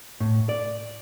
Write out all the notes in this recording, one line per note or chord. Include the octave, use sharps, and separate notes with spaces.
A2
D5